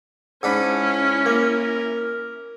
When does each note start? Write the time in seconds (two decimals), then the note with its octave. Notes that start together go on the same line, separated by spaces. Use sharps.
0.43 G#2 C#4 D4 E4 B5
1.26 A#3 A#4